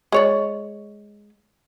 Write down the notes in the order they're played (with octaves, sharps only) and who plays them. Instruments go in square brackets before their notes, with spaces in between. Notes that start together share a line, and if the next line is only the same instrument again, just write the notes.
[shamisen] G#3 C#5 D5